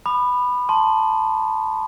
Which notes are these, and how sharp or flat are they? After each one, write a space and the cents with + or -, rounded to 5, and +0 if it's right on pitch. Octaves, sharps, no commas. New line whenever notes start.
B5 +0 D#6 -45
A5 +0 C6 +20